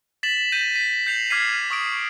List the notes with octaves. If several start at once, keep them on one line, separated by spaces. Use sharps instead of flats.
A6 B6 E7 F#7
G6 A#6 D#7
B6
G6 C7 F7 F#7
D6 F6 G#6 B6 C7 D#7
C#6 D#6 D7